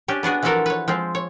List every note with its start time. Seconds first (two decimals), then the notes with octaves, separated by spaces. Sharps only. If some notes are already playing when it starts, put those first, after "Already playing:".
0.08 C#4 D4 G4
0.23 B3 D4 F#4 G#4
0.42 E3 F3 E4 F#4 A4 A#4
0.66 B4 C#5
0.88 F3 G#3 C4
1.15 C#5